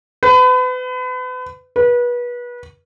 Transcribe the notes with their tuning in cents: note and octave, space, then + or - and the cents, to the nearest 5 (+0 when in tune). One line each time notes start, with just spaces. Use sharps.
B4 +35
B4 -30